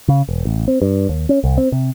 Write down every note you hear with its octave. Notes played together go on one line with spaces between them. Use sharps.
C#3
E1
A1
C4
G2
D#2
C#4
C2
C4
C3